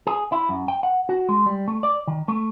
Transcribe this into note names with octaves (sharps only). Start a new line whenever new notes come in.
G#4
E4
F#2
G5
F#5
F#4
G#3
G3
A3
D5
D#3
A3